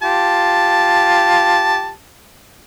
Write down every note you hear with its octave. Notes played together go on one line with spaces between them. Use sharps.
F4 G4 A5